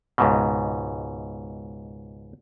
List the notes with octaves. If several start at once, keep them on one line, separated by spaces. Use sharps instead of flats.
C#2 G#2 B2